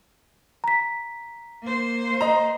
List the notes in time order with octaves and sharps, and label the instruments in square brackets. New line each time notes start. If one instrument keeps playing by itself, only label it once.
[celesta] A#5 B6
[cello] A#3 C5
[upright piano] D#5 A#5